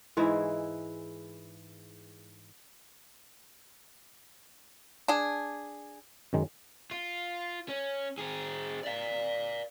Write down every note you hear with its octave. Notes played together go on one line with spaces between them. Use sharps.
G#2 E3 G#3 E4
D4 G#4
F#2 D#3 G#3
F4
C#4
C4 G#4
D5 F5